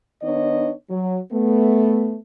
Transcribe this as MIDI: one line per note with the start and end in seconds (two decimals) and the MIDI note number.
0.22 0.71 51
0.22 0.71 59
0.22 0.71 62
0.22 0.71 63
0.22 0.71 73
0.22 0.71 75
0.90 1.18 54
1.32 2.16 57
1.32 2.16 59